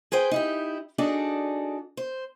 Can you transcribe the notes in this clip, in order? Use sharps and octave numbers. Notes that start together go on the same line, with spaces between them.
G#4 B4 C5 G5
D#4 E4 G4
D4 D#4 F#4 G#4 A4 D5
C5